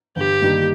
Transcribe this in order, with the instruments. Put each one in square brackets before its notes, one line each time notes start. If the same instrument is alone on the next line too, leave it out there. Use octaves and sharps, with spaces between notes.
[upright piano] G1 [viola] G4
[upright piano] G2 D#3 G3 A#3